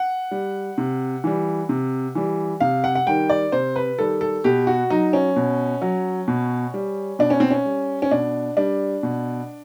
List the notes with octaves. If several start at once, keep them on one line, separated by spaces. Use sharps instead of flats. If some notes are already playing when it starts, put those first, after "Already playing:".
Already playing: F#5
G3
C3
E3 G3
C3
E3 G3
C3 F5
F#5
F#5
D#3 G3 G5
D5
C3 C5
B4
D#3 G3 A4
A4
B2 G4
F#4
F#3 D#4
C#4
B2
F#3
B2
G3
B2 D4
C#4
C4
C#4
G3
C#4
B2 D4
G3 D4
B2